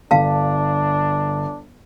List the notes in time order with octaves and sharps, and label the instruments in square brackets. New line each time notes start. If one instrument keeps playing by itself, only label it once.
[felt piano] G1 [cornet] D4 [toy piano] F5 A5